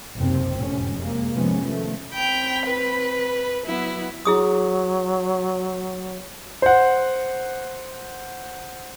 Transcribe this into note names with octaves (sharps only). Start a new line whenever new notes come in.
F#1 D#2 C3 C4
F1 F#2 A2 C3 C#4
C3 G#3 A#3
C3 D#3 F3 G#3 B3 C#4
D#3 F3 A3
C4 G5 B5 F7
B4
F#3 B3 E4
F#3 E4 G#4 D#6
C5 F#5